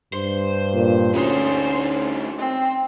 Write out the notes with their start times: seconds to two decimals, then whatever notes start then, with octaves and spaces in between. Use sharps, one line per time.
0.13 G2 C5
0.74 A#2
1.14 D2 A2 C#4 D#4 C5
2.38 C4